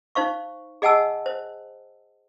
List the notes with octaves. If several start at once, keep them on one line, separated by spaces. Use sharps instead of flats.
D#4 C5 F5 C#6
G#4 D#5 F#5 G#5 A5 E6
C5